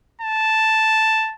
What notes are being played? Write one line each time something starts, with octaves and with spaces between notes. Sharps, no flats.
A5